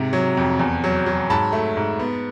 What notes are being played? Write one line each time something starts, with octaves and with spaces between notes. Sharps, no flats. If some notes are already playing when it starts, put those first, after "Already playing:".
Already playing: G#2 C3
F#3
F2
E2
F#3
F#3
G#2 A5 B5
A3
G#2
B3